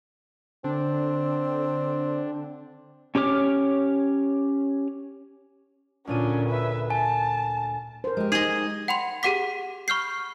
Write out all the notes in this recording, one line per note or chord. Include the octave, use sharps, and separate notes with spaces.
D3 C4 D4
C#4 G4 C#5 D6 F6
D2 A#2 C#4 D4 D#7
B4 E5
G#5 A5
A#4 C5
G#3 G4
D#4 G#4 D#5
F#5 G5 B5 C6 F7
G4 G#4 F#5 D6 B6
B5 C#6 F6 G6 C7